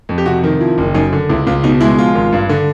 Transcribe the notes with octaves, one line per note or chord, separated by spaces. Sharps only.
F2
G4
C3 F#4
D#3
F3 E4
F#1
F#2 D#4
D3
C#2 E4
C#2 F4
B2 D#4
G#3 E4
F3 F4
G#1
G2
D3